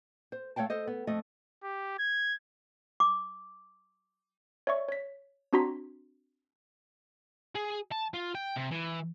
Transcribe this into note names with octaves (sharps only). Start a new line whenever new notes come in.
C5
A3 C#5 F5 G5 A5
A4 C5 D#5
B3
F2 A3 D#5
G4
G#6
D6
C#5 D5 E5 C#6
C#5 B6
C4 D4 F#4 A#5 C6 B6
G#4
A5
F4
G5
C3
E3